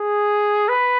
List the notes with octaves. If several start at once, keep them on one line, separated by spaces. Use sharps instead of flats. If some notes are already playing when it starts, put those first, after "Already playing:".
Already playing: G#4
B4